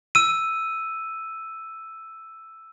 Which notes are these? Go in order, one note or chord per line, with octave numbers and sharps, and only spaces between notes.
E6 D#7